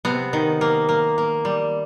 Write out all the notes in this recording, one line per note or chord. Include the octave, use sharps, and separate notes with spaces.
C3 B3
D#3
A#3
A#3
A#3
G3